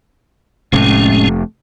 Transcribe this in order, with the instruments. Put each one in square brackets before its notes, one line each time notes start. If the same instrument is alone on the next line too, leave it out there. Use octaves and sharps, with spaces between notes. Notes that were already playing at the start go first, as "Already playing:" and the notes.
[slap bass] F1 C3 A3 [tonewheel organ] A2 G#3 C#4